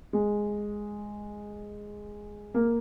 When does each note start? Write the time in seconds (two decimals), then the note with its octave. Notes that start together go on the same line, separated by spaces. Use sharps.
0.13 G#3
2.54 A#3